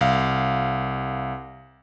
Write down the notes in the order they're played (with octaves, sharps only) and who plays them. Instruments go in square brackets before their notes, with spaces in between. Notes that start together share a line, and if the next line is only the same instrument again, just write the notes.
[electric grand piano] C2 F5